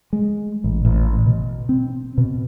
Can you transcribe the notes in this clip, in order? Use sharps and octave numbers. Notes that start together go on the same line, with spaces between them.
G#3
A1
A1
B2
C4
B2